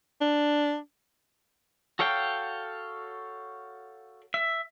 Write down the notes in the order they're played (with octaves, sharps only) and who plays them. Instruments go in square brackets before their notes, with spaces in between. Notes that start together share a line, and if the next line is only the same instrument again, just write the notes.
[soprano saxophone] D4
[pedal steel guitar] F#4 A4 C#5 F5 G5
E5